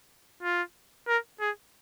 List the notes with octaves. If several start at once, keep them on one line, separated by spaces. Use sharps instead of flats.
F4
A#4
G#4